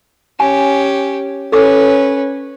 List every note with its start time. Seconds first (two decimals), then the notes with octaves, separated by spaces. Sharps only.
0.40 C#4 G4 G#5
1.52 C#4 A4 B4 D6